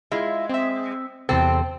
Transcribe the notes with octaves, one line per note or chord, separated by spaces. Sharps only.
G#3 E4 F4 E5
C4 E5
E2 C3 C4 A4